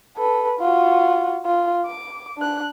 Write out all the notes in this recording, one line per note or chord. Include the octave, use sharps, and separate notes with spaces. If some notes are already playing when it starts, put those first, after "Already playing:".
A4 B4
F4 F#4
F4
D6
D4 F#6